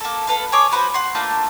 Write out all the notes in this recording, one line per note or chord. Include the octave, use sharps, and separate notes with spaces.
A#3 A4
A4 B4 F5
G#4 C#5 D6
F#4 B4 C5
F#5 C6
A3 A#3 D4 F4